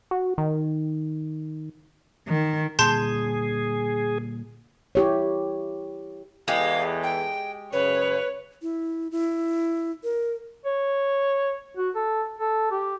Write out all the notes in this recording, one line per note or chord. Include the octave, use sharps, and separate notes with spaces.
F#4
D#3
D#3
A#2 D3 G3 G#4 A5 C6 G6
E4 G4 C#5
E2 E3 G#3 G4 A4 F5
G5
F#2 C#3 B4 C#5
E4
E4
A#4
C#5
F#4
A4
A4
G4